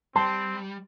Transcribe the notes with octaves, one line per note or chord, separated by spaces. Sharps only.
G3 C4 A5 C6